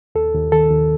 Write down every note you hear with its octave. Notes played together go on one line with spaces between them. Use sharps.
D#2 A4
D#2
D#3 A4
D#2